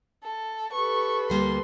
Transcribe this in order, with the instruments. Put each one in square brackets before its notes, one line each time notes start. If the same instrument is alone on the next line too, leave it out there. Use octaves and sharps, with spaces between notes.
[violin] A4
[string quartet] G4 A4 B4 [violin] C#6
[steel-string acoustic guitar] D2 G3 A#3 [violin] C6